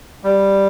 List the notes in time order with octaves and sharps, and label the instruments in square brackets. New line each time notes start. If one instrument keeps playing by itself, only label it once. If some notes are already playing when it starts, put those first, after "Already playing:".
[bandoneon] G3